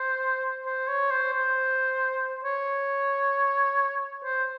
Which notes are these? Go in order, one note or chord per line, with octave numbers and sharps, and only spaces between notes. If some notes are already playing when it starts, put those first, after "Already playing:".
Already playing: C5
C5
C#5
C5
C5
C#5
C5